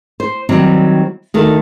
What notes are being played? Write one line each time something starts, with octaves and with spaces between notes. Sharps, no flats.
C5
D#3 F#3 G3 C4
D2 D#3 A4